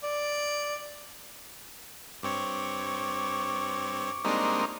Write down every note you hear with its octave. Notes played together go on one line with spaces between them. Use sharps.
D5
G2 C4 C#5 C#6 D6
G3 G#3 A#3 C4 D4 D#4